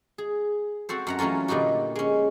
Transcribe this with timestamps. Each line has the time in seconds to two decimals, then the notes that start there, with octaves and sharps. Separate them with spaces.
0.18 G#4
0.89 C4 F#4 A4 C5
1.07 F#2 F#5 A#5
1.19 E3 F#3 A3 C#4 F4
1.48 A#2 D3 G3 D#4 F#4
1.96 G#3 C#4